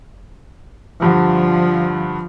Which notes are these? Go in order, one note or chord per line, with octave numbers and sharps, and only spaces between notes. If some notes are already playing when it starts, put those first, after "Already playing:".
G2 D3 F3